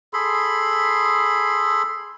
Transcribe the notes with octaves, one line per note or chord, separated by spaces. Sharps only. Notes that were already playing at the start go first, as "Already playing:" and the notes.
G#4 A4 B5 C6